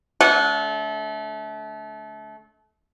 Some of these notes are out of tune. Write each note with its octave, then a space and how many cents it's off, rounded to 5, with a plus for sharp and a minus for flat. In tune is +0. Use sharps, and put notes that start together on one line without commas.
D3 -45 A3 -30 F#5 -30